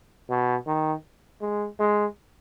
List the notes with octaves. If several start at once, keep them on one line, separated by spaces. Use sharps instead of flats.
B2
D#3
G#3
G#3